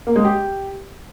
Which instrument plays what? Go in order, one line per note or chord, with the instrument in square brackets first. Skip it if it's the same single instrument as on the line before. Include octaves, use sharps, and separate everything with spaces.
[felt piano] A#3
G#3
G4